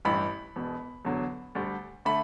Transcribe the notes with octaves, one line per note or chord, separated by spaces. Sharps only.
A1 G2 E3 G3 B5
E1 E2 B2
E2 D3 F#3
D2 D3 G3
D3 A3 B5